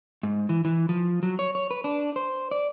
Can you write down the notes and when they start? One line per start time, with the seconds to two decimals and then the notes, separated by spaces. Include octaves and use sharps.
0.23 G#2
0.49 E3
0.65 E3
0.89 F3
1.23 F#3
1.39 C#5
1.55 C#5
1.71 B4
1.84 D4
2.16 C5
2.51 D5